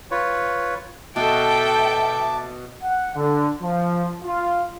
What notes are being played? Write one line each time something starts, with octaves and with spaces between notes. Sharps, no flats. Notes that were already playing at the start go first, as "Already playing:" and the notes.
F4 B4 C#5
B2 A4 E5 G5 A5 D6
F#5
D3
F3
F4